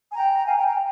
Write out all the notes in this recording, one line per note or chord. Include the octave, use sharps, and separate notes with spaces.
G#5
G5 A#5
A#5
F5 G#5
G5 A#5
G5 A#5